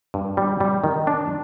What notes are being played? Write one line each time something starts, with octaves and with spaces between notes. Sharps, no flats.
G2
G3
G3
D#3
D4